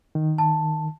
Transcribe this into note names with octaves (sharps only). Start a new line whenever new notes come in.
D#3
A5